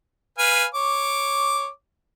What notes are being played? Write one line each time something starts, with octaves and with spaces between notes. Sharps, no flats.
B4 F5 G#5
C#5 D6